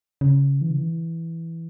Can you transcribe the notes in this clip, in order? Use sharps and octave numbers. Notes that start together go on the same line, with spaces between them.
C#3
E3
C#3
E3